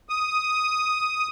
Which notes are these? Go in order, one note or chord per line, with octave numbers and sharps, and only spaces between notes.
D#6